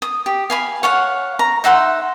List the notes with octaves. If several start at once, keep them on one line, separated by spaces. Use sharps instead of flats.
D#6
G4
F5 G#5 B5
C#5 F5 F#5
A#5
D#4 E5 F#5 C6